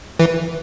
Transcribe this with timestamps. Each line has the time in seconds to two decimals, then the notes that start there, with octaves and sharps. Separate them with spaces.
0.19 E3